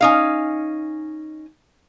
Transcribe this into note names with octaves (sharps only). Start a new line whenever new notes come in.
C#4 D#4 F5